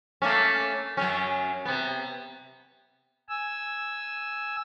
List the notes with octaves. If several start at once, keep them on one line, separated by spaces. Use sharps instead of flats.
A3 A#3 C#4
F#2 F#3 C#4
C3 B3
G#5 E6